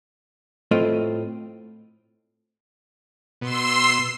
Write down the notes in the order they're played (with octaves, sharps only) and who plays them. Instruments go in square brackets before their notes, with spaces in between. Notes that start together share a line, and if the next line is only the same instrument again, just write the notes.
[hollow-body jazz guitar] A2 A3 C4 F4 D#5
[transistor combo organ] B2 [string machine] C6 E6 C7